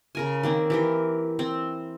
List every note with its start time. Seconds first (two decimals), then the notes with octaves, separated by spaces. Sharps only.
0.15 C#3 A#4 G#5
0.43 D#3 A#3 C4
0.70 E3 G4 A#4
1.39 C4